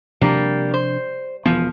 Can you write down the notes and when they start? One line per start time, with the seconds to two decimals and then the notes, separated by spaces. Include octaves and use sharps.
0.21 C3 F3 G3 A#3 D4
0.74 C5
1.46 E1 E3 F3 B3